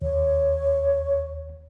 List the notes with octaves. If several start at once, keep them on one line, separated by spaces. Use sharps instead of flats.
D#2 C#5